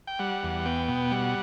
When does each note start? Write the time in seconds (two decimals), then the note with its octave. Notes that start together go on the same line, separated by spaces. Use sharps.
0.07 G5
0.19 G3 F#5
0.43 E2
0.65 B3 G5
0.88 B2
1.11 G3 F#5